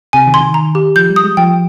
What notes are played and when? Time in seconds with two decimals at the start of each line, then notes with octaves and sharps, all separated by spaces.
0.13 C3 G#5
0.27 D#3
0.34 C6
0.40 D#3
0.54 A#5
0.75 G4
0.96 F3 G6
1.10 G3
1.16 D#6
1.24 G#3
1.37 F3 G5